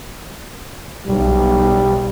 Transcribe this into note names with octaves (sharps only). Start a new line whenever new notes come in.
B1 G3